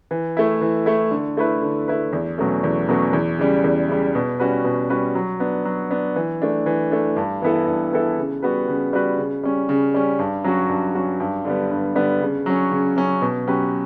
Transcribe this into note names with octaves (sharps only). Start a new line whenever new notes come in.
E3
A3 E4
E3
A3 E4
D3
A3 E4 B4
D3
A3 E4 B4
E2
B2 F#3 A3 C#4
E2
B2 F#3 A3 C#4
E2
C#3 G3
E2
C#3 G3
B2
G3 C#4 F#4 B4
B2
G3 C#4 F#4 B4
F#3
B3 D4
F#3
B3 D4
E3
A3 D4
E3
A3 D4
G2
E3 B3 E4 A4
G2
E3 B3 E4 A4
C#3
G3 B3 F#4 B4
C#3
G3 B3 F#4 B4
C#3
G3 C#4
C#3
G3 C#4
G2
F#3 C#4 F#4
G2
F#3 C#4 F#4
G2
D3 G3 B3
G2
D3 G3 B3
C#3
F#3 C#4
C#3
F#3 C#4
B2
F#3 C#4 G4 B4